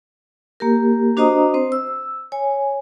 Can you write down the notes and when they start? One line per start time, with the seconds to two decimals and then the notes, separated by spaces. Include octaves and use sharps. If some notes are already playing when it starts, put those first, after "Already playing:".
0.60 A#3 G4 A#4
1.17 D4 F#4 C5 D#5 A#5 D#6
1.54 C4 C5
1.72 E6
2.32 C#5 G#5